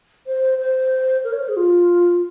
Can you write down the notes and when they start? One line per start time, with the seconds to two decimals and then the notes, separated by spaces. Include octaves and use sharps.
0.26 C5
0.58 C5
1.24 A#4
1.32 C#5
1.40 C5
1.48 G#4
1.56 F4